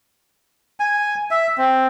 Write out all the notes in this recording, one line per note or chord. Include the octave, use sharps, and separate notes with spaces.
G#5
E5
C4